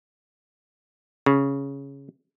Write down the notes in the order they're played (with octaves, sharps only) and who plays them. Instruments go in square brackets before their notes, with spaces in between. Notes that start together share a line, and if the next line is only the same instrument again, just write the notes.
[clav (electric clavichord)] C#3